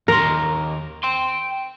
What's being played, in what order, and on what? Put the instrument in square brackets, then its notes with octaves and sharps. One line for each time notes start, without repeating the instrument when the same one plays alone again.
[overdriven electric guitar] D#2 C6 [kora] A#4
[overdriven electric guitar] G5 C6